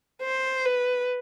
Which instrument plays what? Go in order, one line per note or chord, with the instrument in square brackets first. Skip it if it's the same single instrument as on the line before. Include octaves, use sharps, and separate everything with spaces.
[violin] C5
B4